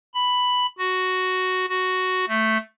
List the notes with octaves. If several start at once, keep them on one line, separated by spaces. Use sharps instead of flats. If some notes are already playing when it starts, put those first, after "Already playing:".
B5
F#4
F#4
A3